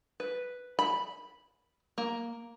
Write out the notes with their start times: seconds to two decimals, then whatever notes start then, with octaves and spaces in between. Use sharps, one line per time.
0.20 B4
0.79 B5
1.98 A#3